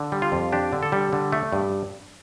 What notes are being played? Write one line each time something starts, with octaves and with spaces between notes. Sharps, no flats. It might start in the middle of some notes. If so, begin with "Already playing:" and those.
Already playing: D3
G3
F4
F2
D4 G4
D3
A4
G3
D3
A3
G2